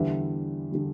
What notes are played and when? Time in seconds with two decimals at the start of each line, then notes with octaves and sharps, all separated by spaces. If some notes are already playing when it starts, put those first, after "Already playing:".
Already playing: E2 D3 G3 B4 E5
0.72 D3 G3